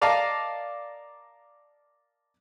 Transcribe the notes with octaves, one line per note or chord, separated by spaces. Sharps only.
A#4 D5 D#5 F5 A5 A#5